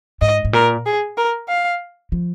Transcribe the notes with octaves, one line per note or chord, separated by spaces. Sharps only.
G#2 D#5
G#2
A#2 A#4
G#4
A#4
F5
F3